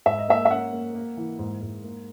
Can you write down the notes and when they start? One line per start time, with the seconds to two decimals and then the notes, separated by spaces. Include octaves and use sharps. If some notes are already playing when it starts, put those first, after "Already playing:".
0.06 G#2 E5
0.19 D#5
0.28 A#3 E5
0.46 E5
0.50 C#4 F#5
0.72 A#3
0.95 A#3
1.17 E3
1.39 G#2
1.62 G#2
1.84 A#3